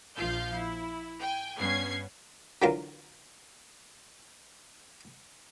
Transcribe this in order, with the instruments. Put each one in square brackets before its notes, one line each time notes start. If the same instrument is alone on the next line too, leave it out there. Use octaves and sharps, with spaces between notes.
[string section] A#1 F3 F4 F5 G6
E4
G5 G#5
G2 B3 C#4 G#6 C7
[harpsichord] D3 E3 F#3 F4 A#4